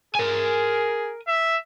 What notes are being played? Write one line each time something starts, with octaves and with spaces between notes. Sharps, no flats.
G#4 A#4 G#5
E5